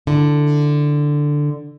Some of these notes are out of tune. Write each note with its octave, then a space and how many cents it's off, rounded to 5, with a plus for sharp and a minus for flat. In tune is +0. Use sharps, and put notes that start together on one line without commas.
D3 +5 E4 +0